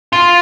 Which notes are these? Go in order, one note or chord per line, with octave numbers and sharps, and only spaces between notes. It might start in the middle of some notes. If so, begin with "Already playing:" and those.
F4